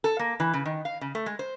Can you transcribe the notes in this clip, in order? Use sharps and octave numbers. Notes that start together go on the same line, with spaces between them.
A4
A#3
E3
C#3
D#3
F5
C#3
A3
G#3
C5